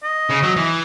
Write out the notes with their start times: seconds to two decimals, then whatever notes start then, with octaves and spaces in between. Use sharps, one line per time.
0.03 D#5
0.30 C#3
0.43 F#3
0.56 E3